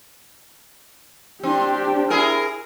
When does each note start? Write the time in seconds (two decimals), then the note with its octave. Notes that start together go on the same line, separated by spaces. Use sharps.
1.43 C4 D4 G4
2.10 E4 G#4 A#4